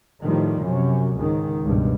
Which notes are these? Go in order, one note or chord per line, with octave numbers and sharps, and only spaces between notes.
A2 D#3 F3 G3
F#2 C3 C#4
C#2 G#2 D#3
C#2 G2 B2